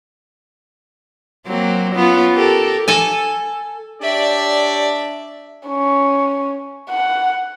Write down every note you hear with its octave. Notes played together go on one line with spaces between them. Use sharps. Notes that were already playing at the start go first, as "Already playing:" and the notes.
F#3 A#3 C4
B3 C#4 F4
G4 A4 A#4
A4 G#5
D4 G4 C#5 D5 E5
C#4
F#5